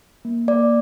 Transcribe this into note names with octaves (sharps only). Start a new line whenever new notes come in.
A#3
A#3 D5